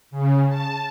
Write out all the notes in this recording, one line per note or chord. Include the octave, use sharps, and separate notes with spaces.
C#3
A5